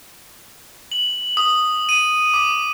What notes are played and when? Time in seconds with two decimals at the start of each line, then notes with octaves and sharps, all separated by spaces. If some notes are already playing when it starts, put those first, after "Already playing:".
0.92 F#7
1.37 D#6
1.89 D#7
2.34 D6